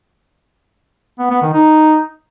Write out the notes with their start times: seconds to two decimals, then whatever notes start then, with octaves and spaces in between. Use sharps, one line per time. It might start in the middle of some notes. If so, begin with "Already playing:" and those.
1.19 B3
1.31 B3
1.42 D#3
1.53 D#4